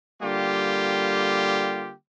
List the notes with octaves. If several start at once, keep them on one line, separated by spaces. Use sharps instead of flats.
D3 G3 A#3 F4 G4